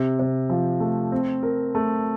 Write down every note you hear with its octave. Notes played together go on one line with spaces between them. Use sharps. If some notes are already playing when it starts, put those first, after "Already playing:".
Already playing: C3
C3
F3
A3
C4
A#4
A3